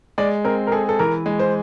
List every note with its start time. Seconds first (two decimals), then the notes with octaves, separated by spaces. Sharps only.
0.18 G#3 D5
0.44 C4 A#4
0.67 A#4
0.72 G#4 A4
0.89 A4
0.99 E3 A#4
1.26 G#3
1.39 C5